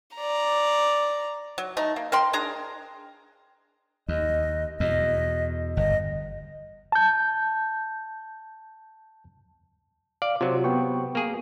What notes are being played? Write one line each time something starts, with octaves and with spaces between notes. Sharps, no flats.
D5 A#5
F#3
A3 D#4 A#5
A#3
A#4 G5 C6
D4 G#4 A#5
D#2 D#5
E2 B2 D#5
G1 D#5
A5 G6
D5 F5
C3 F#3 F4 C5
B3 G5 C#6
A#3 G#4